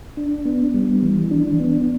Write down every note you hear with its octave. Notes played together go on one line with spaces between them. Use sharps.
D4
B3
G3
E3
D4
B3